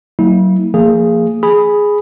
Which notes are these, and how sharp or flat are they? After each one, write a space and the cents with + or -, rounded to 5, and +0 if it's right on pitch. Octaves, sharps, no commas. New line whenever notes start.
F#3 +20 A#3 -25 E4 -35
F3 -20 A#3 -30 G#4 +0
G#4 +0 G#5 +0 B5 +0